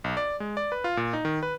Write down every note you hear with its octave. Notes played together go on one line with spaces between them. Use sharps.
B1
D5
G#3
D5
B4
F4
A#2
D#4
D#3
B4